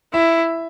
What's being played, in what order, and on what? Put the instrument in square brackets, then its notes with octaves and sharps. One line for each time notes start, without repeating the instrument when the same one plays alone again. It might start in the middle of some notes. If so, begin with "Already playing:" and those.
[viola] E4 [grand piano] E5